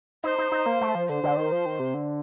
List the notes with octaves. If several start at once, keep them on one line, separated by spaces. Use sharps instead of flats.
D#4 C5
D#4
D#4
A#3
A3
F3
D3 C5
D3
D#3
F3
D#3
C3
D3